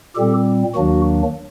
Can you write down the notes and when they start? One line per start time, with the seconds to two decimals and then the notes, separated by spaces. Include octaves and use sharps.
0.15 A#2 G3 C4 G4 A4
0.75 D#2 D#3 F#3 A#3 D4 F#4